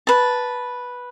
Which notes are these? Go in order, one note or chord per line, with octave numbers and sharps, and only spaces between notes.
B4 A5